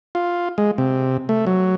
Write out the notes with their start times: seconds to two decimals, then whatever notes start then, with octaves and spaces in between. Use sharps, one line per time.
0.15 F4
0.58 G#3
0.78 C3
1.29 A3
1.47 F#3